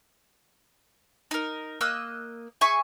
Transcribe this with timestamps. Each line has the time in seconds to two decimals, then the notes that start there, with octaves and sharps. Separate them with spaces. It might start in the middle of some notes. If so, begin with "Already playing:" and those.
1.31 D#4 A#4
1.81 A#3 D#5 E6 F#6
2.61 G#4 E5 G#5 C#6